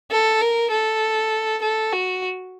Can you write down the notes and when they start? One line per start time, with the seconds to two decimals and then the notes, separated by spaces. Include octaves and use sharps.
0.11 A4
0.41 A#4
0.71 A4
1.62 A4
1.93 F#4